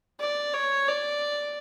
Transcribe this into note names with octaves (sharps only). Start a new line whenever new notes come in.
D5
C#5
D5